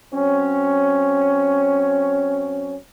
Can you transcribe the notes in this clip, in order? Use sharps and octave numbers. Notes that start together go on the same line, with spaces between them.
F#3 C4 C#4